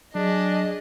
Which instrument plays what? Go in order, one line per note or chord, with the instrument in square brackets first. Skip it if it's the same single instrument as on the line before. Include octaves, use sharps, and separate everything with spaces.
[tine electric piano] F#3 [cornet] D4 [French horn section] G#4 [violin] D#5